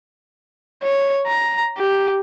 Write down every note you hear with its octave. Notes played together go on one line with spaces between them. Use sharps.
C#5
A#5
G4